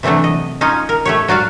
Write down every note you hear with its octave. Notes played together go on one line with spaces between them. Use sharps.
C3 E3 F#3 A3 D4
D#5
C#4 D#4 F4 C#5 D#5
A#4
A3 G4 C#5
F#3 F#4 D5 F5